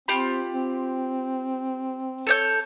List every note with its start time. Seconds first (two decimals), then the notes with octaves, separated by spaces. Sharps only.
0.08 C4 F4 G4 B5
0.54 C4
2.27 A4 C#5 G6